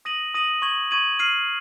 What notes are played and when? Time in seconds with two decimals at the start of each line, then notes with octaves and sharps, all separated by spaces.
0.05 D#6 A#6 D#7 F#7
0.34 D#6 A#6 D#7 F#7
0.62 C#6 G#6 D#7 F#7
0.91 C#6 G#6 D#7 F#7
1.19 F6 C7 D#7 F#7